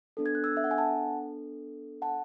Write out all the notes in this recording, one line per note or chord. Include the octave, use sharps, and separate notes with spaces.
B3 D4 A4
G#6
F#6
E6 G#6
E5
F#5
G#5
F#5 A5
F#5 A5